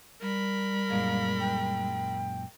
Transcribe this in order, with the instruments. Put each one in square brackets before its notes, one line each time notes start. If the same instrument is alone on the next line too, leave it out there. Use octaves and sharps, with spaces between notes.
[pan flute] G3 [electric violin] A#4 B5
[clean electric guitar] F#2 A#2 G#3 [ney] F5
[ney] G5